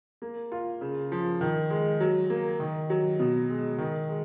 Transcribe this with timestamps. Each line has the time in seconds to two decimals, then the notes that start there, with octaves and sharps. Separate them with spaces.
0.22 A#3
0.52 F4
0.81 C#3
1.12 F3
1.41 D#3
1.70 G#3
2.00 F#3
2.30 A#3
2.60 D#3
2.90 F#3
3.19 B2
3.50 G#3
3.78 D#3
4.09 G#3